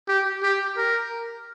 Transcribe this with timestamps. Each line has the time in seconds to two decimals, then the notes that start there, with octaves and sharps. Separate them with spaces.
0.08 G4
0.43 G4
0.77 A#4